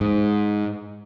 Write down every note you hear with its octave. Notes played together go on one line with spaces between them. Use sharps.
G#2